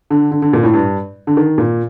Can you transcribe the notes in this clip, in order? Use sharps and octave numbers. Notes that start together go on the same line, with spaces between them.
D3
D3
D3
A#2
A2
G2
D3
D#3
A#2